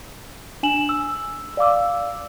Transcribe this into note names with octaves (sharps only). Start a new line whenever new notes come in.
D4 G#5 E7 F#7
E6
D5 F5 D6 E6